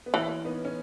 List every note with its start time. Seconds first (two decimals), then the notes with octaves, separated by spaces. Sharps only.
0.06 B3
0.14 E3 A#3 C#4
0.44 B3 D#4
0.65 C#4